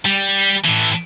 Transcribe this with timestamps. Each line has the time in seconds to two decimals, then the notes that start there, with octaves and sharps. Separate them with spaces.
0.05 G3
0.65 A2 E3